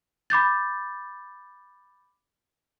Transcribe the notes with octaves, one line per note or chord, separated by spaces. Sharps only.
B5 D6 G6 A6